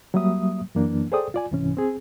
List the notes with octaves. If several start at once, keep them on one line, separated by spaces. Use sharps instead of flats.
F#3 G3 A#3 E5 D#6
F#2 E3 A#3 D4
G#4 A4 C5 D5 G5 D#6
F4 D5 G#5
C2 G#2 C3 E3 C#4
C4 G#4